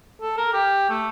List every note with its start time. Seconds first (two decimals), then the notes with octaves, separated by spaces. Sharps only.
0.21 A4
0.37 A#4
0.53 G4
0.89 A3